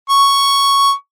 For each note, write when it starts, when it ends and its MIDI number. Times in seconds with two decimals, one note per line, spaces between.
0.10 0.92 85